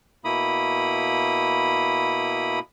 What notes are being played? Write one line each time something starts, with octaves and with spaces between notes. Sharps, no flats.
B2 A#3 E4 B5 D#6